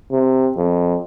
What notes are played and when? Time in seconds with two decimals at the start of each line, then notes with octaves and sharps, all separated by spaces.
0.12 C3
0.57 F2